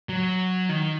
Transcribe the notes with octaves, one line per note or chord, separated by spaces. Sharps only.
F#3
D#3